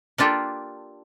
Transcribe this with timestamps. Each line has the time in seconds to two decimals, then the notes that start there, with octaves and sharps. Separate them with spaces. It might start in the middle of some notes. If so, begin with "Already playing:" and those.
0.18 A#3 D4 F4 G4 A4